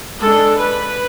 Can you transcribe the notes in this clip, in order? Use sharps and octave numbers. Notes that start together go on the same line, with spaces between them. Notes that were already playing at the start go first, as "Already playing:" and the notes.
G#3 D4 A4
B4